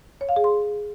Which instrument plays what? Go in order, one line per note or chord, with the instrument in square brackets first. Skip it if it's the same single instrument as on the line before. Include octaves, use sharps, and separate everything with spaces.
[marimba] C#5
F5
G#4
C6